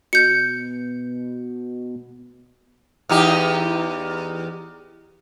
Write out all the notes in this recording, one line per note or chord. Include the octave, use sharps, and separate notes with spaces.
B2 G6 C#7
E2 D#4 G4